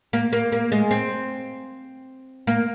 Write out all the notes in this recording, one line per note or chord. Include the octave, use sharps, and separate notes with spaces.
A#3
A#3
A#3
G#3
C4
A#3